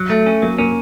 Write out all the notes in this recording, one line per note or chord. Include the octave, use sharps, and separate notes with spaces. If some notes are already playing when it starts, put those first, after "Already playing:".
Already playing: F#3
A3
C#4
F#3 A#3
A#3 C#4